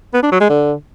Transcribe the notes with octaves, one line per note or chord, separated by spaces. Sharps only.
B3
D4
F#3
G#3
D3